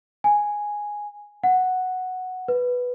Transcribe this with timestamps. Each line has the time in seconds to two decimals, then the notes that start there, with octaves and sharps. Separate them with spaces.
0.24 G#5
1.44 F#5
2.48 B4